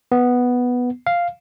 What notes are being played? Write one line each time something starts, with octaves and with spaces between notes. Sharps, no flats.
B3
F5